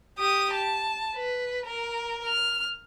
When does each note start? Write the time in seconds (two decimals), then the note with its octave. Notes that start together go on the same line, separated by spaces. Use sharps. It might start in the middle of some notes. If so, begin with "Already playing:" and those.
0.19 G4 D#6
0.54 A5
1.15 B4
1.67 A#4
2.25 F6